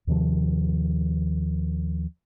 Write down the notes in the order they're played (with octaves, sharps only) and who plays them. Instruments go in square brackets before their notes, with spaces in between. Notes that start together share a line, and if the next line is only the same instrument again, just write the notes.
[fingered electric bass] D#2 C3 D#3 F3